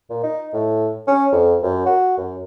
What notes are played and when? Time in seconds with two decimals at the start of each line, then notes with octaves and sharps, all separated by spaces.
0.10 A#2
0.23 D#4
0.53 A2
1.07 C#4
1.32 F2
1.63 F#2
1.86 F#4
2.18 F#2